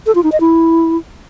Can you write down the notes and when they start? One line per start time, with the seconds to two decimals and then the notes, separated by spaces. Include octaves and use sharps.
0.06 A4
0.15 F4
0.23 D#4
0.32 D#5
0.40 E4